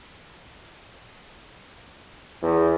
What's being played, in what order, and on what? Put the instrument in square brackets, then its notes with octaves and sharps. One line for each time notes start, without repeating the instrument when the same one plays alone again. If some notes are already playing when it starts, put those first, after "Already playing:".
[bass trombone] E2